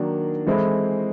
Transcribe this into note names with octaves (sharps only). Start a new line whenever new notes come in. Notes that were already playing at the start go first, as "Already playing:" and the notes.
Already playing: D#3 F#3 A#3 D4
E3 G#3 C4 E4 A4